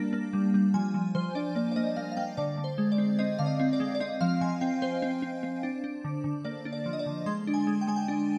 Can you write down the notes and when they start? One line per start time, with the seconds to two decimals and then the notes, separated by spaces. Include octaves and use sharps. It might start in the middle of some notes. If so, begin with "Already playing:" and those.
Already playing: G3 A#3 D4
0.13 A#3
0.33 G3
0.54 G3
0.74 F3 G#5
0.94 F3
1.15 F3 C5
1.35 D4 D5
1.55 A#3 D5
1.72 D5
1.76 A#3 D#5
1.96 A#3 F5
2.12 F5
2.17 A#3 G5
2.37 D3 D5
2.58 D3
2.64 C5
2.78 G#3
2.92 D5
2.98 C4
3.19 C4 D#5
3.39 D3 F5
3.46 D#5
3.60 C4
3.73 D5
3.80 G#3
3.95 D5
4.00 C4 D#5
4.21 F3 F5
4.41 F3 G#5
4.61 C4 G5
4.82 C4 C5
5.02 C4
5.22 C4
5.43 C4
5.63 D4
5.84 D4
6.04 D3
6.24 D3
6.45 A#3 D5
6.65 D4
6.73 D5
6.86 F3
6.93 D#5
6.99 D5
7.06 D3
7.26 G#3 C6
7.47 D4
7.54 G#5
7.67 G#3
7.81 G5
7.87 G#3 G#5
7.96 G5
8.08 D4